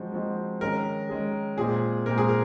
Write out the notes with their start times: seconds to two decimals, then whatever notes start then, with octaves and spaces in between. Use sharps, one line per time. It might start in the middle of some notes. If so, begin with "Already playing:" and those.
Already playing: F3 G#3 C4 D#4 F#4
0.12 F3 G#3 C4 D#4 F#4
0.60 D#3 G#3 C#4 G#4 A#4
1.09 D#3 G#3 C#4 G#4
1.57 A#2 G#3 C4 G#4
2.06 A#2 G#3 C4 A#4
2.18 G#4
2.29 A#4